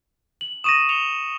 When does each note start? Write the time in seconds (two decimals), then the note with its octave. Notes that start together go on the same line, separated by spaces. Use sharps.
0.41 F#7
0.64 C#6 D#6 A#6 D#7 E7
0.89 C#7 F7 G7